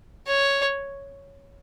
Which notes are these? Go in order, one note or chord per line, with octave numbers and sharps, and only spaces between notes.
C#5